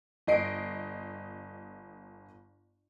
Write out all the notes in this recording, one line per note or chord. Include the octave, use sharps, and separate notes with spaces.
G1 D#5 C7 D7